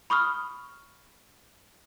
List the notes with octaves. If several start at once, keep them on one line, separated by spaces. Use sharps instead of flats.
B5 C#6 D#6 F6